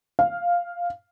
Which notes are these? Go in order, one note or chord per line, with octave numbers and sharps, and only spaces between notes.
F5